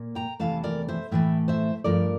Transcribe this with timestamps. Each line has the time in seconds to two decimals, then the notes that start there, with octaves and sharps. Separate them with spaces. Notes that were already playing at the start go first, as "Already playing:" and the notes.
Already playing: A#2 A#3
0.15 G5 A#5
0.39 E2 C3 E3 A3 F5 A5
0.64 A#4 D5
0.88 C5 E5
1.11 A2 E3 A3 E5 G5
1.48 C5 E5
1.84 G2 F3 A3 A#4 D5